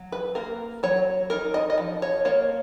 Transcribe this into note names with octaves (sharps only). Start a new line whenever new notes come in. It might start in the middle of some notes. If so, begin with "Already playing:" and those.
Already playing: F#3
B4
A#3 A#4
F#3 C#5
D#4 A#4
D#5
D#5
F3
C#5
A#3 C#5